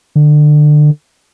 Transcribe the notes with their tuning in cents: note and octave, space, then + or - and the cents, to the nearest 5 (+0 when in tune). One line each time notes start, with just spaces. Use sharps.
D3 +25